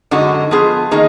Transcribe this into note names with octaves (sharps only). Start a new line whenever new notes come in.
F#2 D3 G#3 D#4 F#4
F3 B3 F4 G#4
D#3 A#3 D#4 G#4